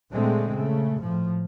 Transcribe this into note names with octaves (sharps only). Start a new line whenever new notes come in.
A#2 D3 G#3 A3 C4
C#3 A3
A2 F3